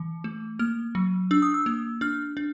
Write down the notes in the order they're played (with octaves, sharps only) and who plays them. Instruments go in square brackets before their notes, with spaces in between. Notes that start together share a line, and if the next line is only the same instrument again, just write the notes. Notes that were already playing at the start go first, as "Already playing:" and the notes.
Already playing: [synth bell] E3
A3
A#3 F6
F#3
D4 E6
D#6
E6
A#3
D4 F6
D4